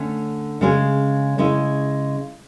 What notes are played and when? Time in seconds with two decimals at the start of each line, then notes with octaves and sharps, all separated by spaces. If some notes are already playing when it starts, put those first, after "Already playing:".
Already playing: D3 A3 C#4
0.61 C#3 G#3 C#4 G#4
1.38 C#3 G#3 C#4 E4